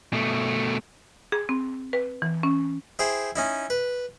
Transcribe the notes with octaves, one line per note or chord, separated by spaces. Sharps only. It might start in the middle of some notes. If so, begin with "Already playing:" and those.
B2 A3
G#4
C4
B4
E3
C#4
E4 G#4 C5 G5
C#4 D#4 E4
B4